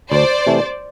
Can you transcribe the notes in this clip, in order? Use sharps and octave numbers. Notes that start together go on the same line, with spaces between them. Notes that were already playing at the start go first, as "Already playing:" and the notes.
D2 C5 D5
C3 E3 A3